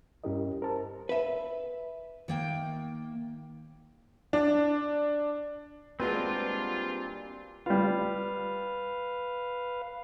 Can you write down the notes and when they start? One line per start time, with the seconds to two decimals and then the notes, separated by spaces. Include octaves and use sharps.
0.24 G2 C#4 E4 G4 A#4 D#5
0.62 A#4 C5 A5
1.09 B4 E5
2.28 D#3 A#3 G5
4.33 D4
6.00 A#2 G3 G#3 C4 D4 F4 F#4 B4
7.66 G3 F4 B4 F5